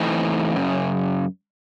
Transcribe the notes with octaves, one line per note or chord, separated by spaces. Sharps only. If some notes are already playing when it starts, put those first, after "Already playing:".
Already playing: E3 A3 C4 D#4
F#2 C#3